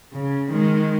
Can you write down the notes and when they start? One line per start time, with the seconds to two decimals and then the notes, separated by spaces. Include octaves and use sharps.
0.14 C#3
0.52 D#3 G#3